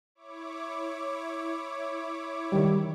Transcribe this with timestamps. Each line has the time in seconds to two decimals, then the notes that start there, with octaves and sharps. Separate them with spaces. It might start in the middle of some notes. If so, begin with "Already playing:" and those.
0.15 E4 C#5 D6
2.52 D#3 G3